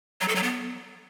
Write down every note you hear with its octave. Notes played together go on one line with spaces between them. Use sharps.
F#3
A4
F#3
B3